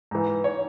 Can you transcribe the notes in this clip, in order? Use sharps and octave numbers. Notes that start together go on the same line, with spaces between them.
G#2 E3
C#5